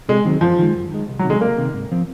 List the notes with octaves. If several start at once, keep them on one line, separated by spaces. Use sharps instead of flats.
C3 G#3
D#3 F#3 C4
F#2 F3
D#3 G#3
F#2
D#3 G#3
C2
F#3
C3 D#3
G#3
C2 A#3
C3 D#3
G#2
F3 C4